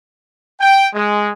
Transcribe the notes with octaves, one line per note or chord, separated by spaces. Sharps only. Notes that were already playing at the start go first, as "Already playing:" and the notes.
G5
G#3